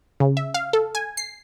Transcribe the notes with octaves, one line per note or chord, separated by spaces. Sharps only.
C#3
E5
F5
A4
G#5
C7